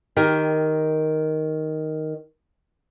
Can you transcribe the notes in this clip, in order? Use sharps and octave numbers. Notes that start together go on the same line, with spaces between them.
D#3 G4 A#4